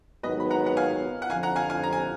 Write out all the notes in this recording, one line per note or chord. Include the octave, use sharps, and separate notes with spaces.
G#2 D#3 F#3 B3 B4 D#5
B5
F#5 A#5
F#5
F5 G#5
F#5
F2 D3 F3 F5 G#5
F#5 A#5
F5 G#5
F5 G#5
A#5
G#5